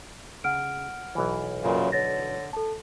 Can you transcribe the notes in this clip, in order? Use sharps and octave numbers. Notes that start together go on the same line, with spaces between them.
C#3 F#5 F6 D7
B1 E3
F#2 A#2 C#3
D3 C#5 A6 A#6
A4 A5